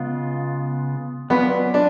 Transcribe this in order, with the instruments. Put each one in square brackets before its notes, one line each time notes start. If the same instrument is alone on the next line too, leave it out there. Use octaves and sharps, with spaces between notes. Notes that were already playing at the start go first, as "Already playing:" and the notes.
Already playing: [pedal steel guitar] C#3 G#3 B3 F4
[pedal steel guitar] F#3 C#4 F4 B4 D5 [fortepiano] B3
[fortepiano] D4